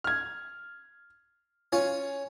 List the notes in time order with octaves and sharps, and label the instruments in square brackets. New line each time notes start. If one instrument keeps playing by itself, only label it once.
[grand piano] F6 G#6
[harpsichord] C#4 C#5 [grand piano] F4